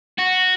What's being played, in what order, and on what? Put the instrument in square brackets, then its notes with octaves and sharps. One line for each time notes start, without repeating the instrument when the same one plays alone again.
[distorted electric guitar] F#4